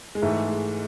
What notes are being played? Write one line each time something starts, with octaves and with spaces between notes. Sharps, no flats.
G#3
G#2 E3 A3
G#3